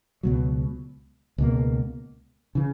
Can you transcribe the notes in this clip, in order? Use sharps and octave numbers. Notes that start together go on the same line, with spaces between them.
C#2 B2 F#3
C#2 B2 A#3
C#3 E3